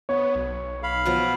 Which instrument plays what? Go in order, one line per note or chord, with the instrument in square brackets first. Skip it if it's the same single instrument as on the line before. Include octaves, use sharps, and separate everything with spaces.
[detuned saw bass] B3 [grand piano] C#5
[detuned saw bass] B1
[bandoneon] F5 B5
[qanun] B2 F3 F#3